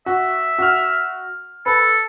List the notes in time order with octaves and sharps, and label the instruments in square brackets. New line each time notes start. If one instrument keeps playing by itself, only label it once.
[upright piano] F#4 [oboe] E5
[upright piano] F#4 F6
[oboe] A4 [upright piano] B4